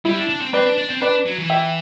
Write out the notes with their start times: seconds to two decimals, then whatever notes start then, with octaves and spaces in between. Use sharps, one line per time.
0.05 G3 E4
0.17 D4
0.29 D4
0.41 C4
0.53 C4 B4 D5
0.66 D4
0.78 D4
0.90 C4
1.01 D4 B4 D5
1.26 F#3
1.39 E3
1.50 E5 G5